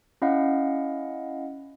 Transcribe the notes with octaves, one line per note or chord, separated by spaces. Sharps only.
C#4 E4 D#5 F5 F#5